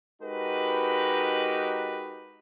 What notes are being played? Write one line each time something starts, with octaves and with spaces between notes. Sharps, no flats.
G#3 D#4 F#4 G4 A#4 B4